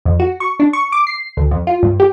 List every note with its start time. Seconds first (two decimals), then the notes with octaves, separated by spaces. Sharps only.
0.05 F2
0.20 F#4
0.40 C#6
0.60 D4
0.73 C#6
0.92 D6
1.07 C7
1.37 D2
1.51 F2
1.67 F4
1.83 G2
2.00 G4